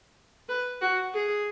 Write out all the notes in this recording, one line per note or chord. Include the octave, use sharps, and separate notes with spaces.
B4
F#4
G#4